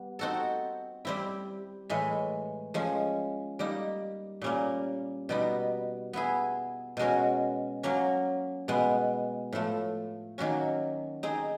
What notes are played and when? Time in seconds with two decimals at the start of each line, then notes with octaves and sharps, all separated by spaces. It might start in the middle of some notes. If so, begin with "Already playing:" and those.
Already playing: G3 B3
0.19 C4 D#4 F#4 A4
1.05 G3 C4 E4
1.90 A2 E3 G#3
2.74 F3 G#3 C#4
3.59 G3 A#3 D#4
4.42 A#2 G3 A#3 C#4
5.29 B2 G3 B3 D#4
6.13 B3 E4 G#4
6.97 B2 G#3 C#4 F#4 A#4
7.83 F#3 A#3 C#4
8.68 B2 G#3 B3
9.53 A2 F3 A3
10.38 D#3 F#3 A#3 C#4 F#4
11.23 C4 D#4 G#4